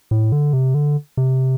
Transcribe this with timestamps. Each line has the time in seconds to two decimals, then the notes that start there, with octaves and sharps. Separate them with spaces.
0.11 A2
0.32 D3
0.53 C3
0.74 D3
1.17 C3